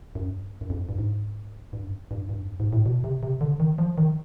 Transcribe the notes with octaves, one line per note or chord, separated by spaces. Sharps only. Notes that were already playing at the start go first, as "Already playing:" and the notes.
F#2
G2
F#2
F2
G2
G#2
G2
F#2
G2
G2
F2
F#2
G#2
A2
B2
C3
C3
D3
D#3
F3
D#3